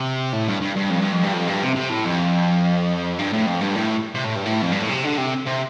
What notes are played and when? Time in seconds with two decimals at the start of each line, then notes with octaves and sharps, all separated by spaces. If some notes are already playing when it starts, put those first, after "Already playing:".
Already playing: C3
0.33 A2
0.48 G2
0.61 G2
0.76 G2
0.90 F2
1.01 G2
1.12 F2
1.23 G2
1.34 F2
1.48 G2
1.62 C3
1.75 C3
1.90 A2
2.05 F2
3.19 G2
3.33 A2
3.47 F2
3.61 G2
3.75 A2
4.14 C3
4.24 A2
4.36 G2
4.46 A2
4.62 F2
4.72 G2
4.80 A2
4.89 C3
5.04 D3
5.18 C3
5.46 C3